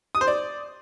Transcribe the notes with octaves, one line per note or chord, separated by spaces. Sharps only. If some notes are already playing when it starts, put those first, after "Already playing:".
D#6
C5
D5